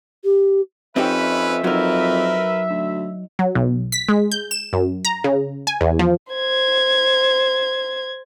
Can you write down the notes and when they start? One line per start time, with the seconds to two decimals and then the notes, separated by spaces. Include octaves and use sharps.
0.24 G4
0.96 F2 C4 C#4 D#4 G4 B4 E5
1.64 F2 F#3 D#4 A#4 B4
2.70 D2
3.39 F#3
3.55 B1
3.92 B6
4.08 G#3
4.31 G6
4.51 E7
4.73 F#2
5.05 A#5
5.24 C#3
5.67 G#5
5.81 E2
5.99 F3
6.33 C5 G#6